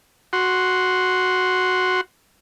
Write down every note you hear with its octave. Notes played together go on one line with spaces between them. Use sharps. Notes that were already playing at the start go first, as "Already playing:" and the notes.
F#4 C6